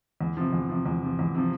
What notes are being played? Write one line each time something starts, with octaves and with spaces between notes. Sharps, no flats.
E2
C3 F3
E2
C3 F3
E2
C3 F3
E2
C3 F3